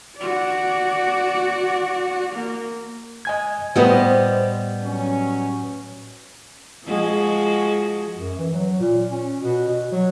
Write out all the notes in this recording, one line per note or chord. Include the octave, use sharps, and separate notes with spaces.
F#4 D5
A#3
D#5 G#5 G#6
A2 G3 B3 B4 C5 D#5
F#3 C#4
F3 G#3 F#4
F#2
E3
F#3
A#2
C#4
B2
B2
F#3